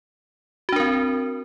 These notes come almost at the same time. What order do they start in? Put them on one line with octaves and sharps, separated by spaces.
F#4 D4 A#4 C4